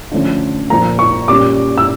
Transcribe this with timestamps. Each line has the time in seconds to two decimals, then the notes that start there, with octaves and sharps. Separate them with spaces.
0.12 D3 F3 A3 C#4
0.70 A#2 F3 A#3 A#5
0.99 C#6
1.28 A#2 G3 C#4 D6
1.78 E6